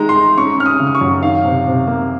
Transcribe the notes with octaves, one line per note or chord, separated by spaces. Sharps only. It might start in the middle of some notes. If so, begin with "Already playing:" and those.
Already playing: D#3 G#3 D#4 A#5
C6
D#4
C#4 C#6
C#4 F6
D#6
C#3
D#6
C#6
F#2
D#3 F5
C3
C3
A#3